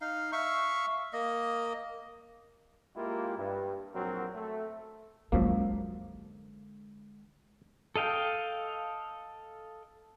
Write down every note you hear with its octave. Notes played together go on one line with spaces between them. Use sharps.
D#4 F5
E5 F5 C#6
A#3 D#5
G#3 A#3 E4 F4 G4
G2
A#1 F#3 C4 F#4 A#4
A3
F#2 D3 F3 G#3 A#3
A4 D#5 F5 G5